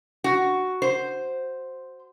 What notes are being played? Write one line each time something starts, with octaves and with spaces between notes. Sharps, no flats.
F#4
C5